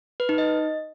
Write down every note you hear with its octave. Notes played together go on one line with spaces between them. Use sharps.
B4
D#4
D#5